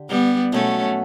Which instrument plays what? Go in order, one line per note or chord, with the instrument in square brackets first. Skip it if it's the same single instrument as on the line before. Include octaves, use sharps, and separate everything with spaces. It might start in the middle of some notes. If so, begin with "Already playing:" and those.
Already playing: [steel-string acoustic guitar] D3 G4
[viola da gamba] G3 B3
[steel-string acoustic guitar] B2 F#3 B3 [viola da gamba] A3 C#4